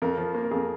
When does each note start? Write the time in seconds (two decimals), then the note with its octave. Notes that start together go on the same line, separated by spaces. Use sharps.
0.02 F2 A#4
0.18 F3
0.35 A#3
0.43 A#4
0.51 F2 G#4